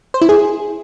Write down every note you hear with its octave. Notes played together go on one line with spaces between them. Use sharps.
C5
E4
G#4